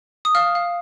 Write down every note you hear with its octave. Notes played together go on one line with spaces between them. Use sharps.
D#6
F5 F6
F5